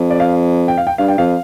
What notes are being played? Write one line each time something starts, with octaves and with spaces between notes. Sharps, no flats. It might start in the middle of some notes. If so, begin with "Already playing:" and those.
Already playing: F2
D5
F5
G5
F5
G5
G2 F5
G5
F2 F5